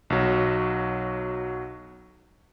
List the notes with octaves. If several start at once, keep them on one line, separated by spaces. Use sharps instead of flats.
B1 F#3